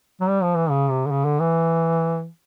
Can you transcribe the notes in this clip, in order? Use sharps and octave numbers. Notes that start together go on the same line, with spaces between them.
F#3
G3
F3
E3
C#3
C3
D3
C#3
D3
E3